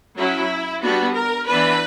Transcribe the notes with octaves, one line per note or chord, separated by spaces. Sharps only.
F#3 C#4 E4
G3 B3 D4 F#4
A#4
E3 B3 D4 B4